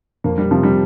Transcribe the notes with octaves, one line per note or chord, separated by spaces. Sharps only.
F2 A#3
G3
C3 F3
G3